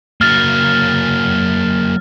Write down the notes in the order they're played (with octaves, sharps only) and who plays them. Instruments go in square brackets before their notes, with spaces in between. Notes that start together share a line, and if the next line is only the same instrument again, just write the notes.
[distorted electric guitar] F#3 A#3 [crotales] F6 A6